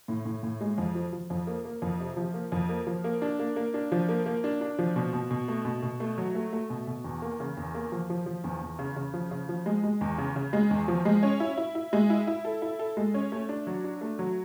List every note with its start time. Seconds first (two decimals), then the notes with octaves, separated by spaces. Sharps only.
0.08 A2
0.25 A2
0.43 A2
0.61 G#3
0.78 F2
0.95 F3
1.13 F3
1.30 F2
1.47 A#3
1.65 A#3
1.82 F2
1.99 C3
2.17 F3
2.34 A#3
2.52 F2
2.69 A#3
2.87 F3
3.04 A#3
3.22 D4
3.39 A#3
3.56 A#3
3.74 D4
3.92 F3
4.09 A#3
4.26 A#3
4.44 D4
4.61 D4
4.79 F3
4.96 B2
5.13 B2
5.31 B2
5.48 A3
5.65 B2
5.83 B2
6.00 A3
6.18 F#3
6.35 A3
6.53 A3
6.70 B2
6.87 B2
7.04 E2
7.22 A#3
7.40 C#3
7.57 E2
7.75 A#3
7.92 F3
8.10 F3
8.26 F3
8.44 E2
8.61 E2
8.79 C#3
8.96 C#3
9.14 F3
9.31 C#3
9.49 F3
9.66 G#3
9.84 G#3
10.01 E2
10.18 C#3
10.36 C#3
10.53 G#3
10.71 E2
10.88 F3
11.05 G#3
11.23 C#4
11.40 E4
11.58 E4
11.75 E4
11.93 G#3
12.10 E4
12.27 E4
12.45 A4
12.62 E4
12.79 A4
12.97 G#3
13.14 C#4
13.32 A3
13.49 D4
13.67 F#3
13.84 D4
14.01 A3
14.19 F#3